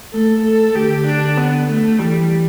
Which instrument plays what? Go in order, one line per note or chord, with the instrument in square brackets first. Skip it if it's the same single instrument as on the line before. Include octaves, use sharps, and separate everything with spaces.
[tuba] A3 [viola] A4
[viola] A4
[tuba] D3 [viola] G4
[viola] D4
B3
A3
[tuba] E3 [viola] G3